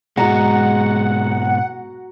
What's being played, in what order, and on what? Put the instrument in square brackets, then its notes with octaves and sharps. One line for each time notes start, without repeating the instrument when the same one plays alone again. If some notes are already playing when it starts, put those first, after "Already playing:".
[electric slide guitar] G#2 B2 [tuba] G#3 [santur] F#4 A#5 [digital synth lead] F#5